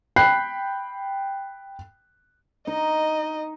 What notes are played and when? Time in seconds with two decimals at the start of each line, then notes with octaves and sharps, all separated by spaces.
0.16 G5 B5 F#6 C7
2.67 D#4 D#5